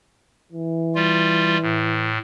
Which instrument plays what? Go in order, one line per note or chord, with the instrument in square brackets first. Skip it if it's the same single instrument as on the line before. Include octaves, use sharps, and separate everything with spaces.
[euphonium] E3
[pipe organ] G3 F4
A2